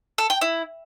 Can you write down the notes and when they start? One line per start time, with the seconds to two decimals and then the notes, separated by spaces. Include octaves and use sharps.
0.18 A4
0.30 G5
0.41 E4